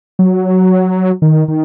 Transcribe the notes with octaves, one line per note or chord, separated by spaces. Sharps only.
F#3
D#3
D#3